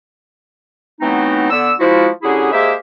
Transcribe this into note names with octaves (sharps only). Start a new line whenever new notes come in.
E3 F#3 A3 B3 C4 D#4
D3 B3 E6
F3 G#3 E4 F#4
D3 F#3 C#4 E4 G4 G#4
G#3 A#3 G4 G#4 C5 E5